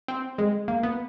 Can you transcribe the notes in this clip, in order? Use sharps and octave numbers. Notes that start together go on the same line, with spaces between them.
C4
G#3
A#3
B3